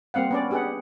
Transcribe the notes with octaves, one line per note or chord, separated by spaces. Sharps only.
G3 A#3 C4 F5 F#5
B3 C#4 D5
D4 G4 G#4 B4 F#5